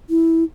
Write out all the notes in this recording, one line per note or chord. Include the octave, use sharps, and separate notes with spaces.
E4